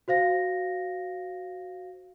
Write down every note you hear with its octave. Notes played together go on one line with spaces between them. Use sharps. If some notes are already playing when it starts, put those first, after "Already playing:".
F#4 C5 F5 A#6